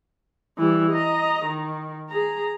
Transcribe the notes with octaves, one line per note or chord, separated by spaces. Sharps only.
E3 G3
D#5 A#5
D#3
G#4 A#5